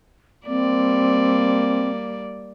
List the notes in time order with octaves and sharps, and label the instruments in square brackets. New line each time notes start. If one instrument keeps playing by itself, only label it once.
[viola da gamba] G3 A#3 D5 [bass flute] C4